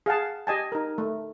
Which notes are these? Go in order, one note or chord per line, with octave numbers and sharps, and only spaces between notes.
G#4 F5 F#5 A5
G4 D#5 G#5 A5
D#4 A#4
A3